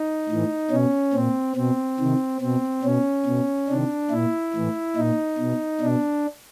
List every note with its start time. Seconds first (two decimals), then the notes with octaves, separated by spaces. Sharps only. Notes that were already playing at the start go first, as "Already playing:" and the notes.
Already playing: D#4
0.29 A2 E3
0.70 B2 C#4
1.13 A#2 C4
1.56 B2 C4
1.99 C3 D#3
2.41 B2 C4
2.83 B2 C#4
3.25 B2
3.69 C3 D#3 D4
4.10 A#2 E4
4.54 A2 E3
4.96 A#2 D#4
5.38 B2
5.81 B2 D4